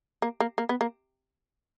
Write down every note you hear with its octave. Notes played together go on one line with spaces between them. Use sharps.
A#3
A#3
A#3
B3
A#3